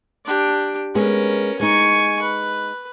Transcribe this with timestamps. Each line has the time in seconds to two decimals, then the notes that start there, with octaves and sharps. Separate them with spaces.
0.25 D4 G4
0.95 G#3 B3 C#4 A#4
1.60 G#3 D#4 G#5 C#6
2.22 B4